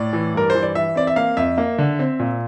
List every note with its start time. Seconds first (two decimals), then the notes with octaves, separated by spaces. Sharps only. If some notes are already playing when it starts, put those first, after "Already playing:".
Already playing: A2 D5
0.13 E3
0.34 G2 A#4
0.50 E3 C5
0.63 D5
0.75 E3 E5
0.95 C4 D5
1.07 E5
1.16 A#3 F5
1.37 F2 E5
1.58 A#3
1.78 D3
1.99 C4
2.19 A#2